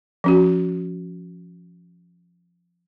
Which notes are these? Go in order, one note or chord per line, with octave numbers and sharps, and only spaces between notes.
F3 C#4 F#4